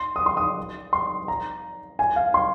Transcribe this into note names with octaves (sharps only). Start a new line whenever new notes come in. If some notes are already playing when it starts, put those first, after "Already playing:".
Already playing: C6
D#6
C6
D#6
C6
A#5
G#5
F5
C6